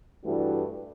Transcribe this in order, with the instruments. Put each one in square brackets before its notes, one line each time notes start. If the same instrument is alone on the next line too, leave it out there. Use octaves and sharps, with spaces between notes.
[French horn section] G2 E3 A3 D4 F#4